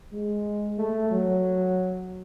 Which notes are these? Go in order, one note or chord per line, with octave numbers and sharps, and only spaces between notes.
G#3
A3
F#3